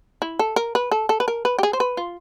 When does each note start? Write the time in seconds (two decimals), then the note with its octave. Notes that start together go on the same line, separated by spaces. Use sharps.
0.22 E4
0.39 A4
0.56 A#4
0.75 B4
0.91 A4
1.09 A4
1.20 B4
1.28 A#4
1.45 B4
1.59 G4
1.63 G#4
1.73 C5
1.80 B4
1.97 F4